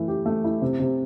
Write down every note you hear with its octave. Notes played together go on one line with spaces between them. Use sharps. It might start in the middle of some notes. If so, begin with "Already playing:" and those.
Already playing: E3 A3 E4
G4
A3
E4
C3
C3